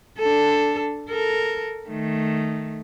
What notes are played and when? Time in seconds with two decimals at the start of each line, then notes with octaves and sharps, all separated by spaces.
0.18 D4 A4
1.10 A4 A#4
1.88 D#3 A3